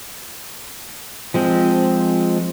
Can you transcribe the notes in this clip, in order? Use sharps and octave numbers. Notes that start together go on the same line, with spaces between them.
F3 G#3 C4